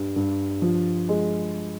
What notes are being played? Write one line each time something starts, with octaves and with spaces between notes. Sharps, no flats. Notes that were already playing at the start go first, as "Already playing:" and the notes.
Already playing: G2
G2
F3
G#3